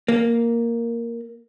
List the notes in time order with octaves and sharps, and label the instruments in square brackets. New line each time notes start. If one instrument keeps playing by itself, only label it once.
[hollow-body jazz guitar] A#3